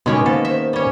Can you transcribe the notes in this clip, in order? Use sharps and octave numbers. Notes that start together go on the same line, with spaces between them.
B2 D#3 G#3 C#4 G4
D#3 A#3 B3 A4 C5
E5
G3 C#4